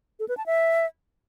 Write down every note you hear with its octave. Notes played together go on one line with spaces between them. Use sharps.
A4
B4
A5
E5